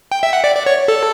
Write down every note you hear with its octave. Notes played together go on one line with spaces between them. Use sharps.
G5
E5
F#5
D5
D5
C#5
A4